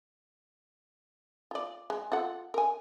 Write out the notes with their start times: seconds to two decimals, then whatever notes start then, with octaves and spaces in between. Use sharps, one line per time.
1.51 F4 D5
1.90 G#3
2.12 F4 A4 F#5
2.54 A#4 G#5